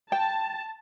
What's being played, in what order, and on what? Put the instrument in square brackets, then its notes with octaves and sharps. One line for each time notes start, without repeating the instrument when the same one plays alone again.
[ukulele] G5 [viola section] A5